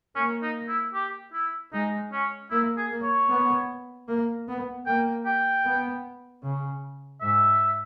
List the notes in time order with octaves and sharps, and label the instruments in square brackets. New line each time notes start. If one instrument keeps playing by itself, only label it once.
[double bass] A#3 [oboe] C#4
[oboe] D#4
E4
G4
E4
[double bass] G#3 [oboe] D#4
[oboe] C#4
[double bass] A#3 [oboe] E4
[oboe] G#4
[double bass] A#3
[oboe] C#5
[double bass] B3
A#3
B3
[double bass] A#3 [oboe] G5
[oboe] G5
[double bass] B3
C#3
[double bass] G#2 [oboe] E5